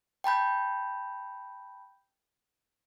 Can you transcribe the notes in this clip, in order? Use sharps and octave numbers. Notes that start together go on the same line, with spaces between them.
G5 A5 B5 G6